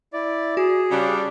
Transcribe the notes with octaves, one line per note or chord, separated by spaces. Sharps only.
E4 D5
F#4 G#4
C#3 G3 D4